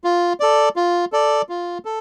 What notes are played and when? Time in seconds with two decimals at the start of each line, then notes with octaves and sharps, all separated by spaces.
0.04 F4
0.40 A4 D5
0.76 F4
1.12 A4 D5
1.49 F4
1.85 A4